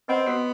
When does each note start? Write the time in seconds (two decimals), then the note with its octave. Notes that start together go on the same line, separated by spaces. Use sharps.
0.08 C4 B4 D#5 F#5 B5
0.27 B3 F#4